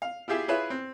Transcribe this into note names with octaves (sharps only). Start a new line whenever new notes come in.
F5
E4 F4 G4 G#4 E5
E4 F4 G#4 B4 C#5 E5
C4